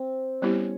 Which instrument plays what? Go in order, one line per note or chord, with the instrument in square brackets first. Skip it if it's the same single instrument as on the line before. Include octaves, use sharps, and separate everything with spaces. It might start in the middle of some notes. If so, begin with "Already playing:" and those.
Already playing: [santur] C4
[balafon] G3 B3 E4 G4 [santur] C#4